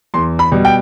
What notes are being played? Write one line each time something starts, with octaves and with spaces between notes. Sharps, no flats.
E2 C6
B5
B2 G3
G5